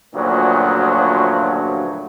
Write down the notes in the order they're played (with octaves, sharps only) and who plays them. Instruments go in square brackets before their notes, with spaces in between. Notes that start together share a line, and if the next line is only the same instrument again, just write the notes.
[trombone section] D2 G2 A#2 C#3 F3 F#3